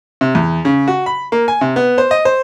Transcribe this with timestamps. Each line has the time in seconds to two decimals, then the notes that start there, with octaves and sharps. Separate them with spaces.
0.21 C3
0.35 E2
0.65 C#3
0.88 F#4
1.06 B5
1.32 A#3
1.48 G#5
1.61 C3
1.76 B3
1.98 C5
2.11 D#5
2.25 C5